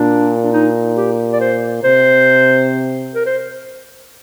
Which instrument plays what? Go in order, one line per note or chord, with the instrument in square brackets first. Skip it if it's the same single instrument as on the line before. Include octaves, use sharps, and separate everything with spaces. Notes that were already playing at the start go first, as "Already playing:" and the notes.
Already playing: [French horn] A#2 [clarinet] D4
[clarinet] D4
D#4
G4
D5
C5
[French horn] C3 [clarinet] C5
[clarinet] A#4
C5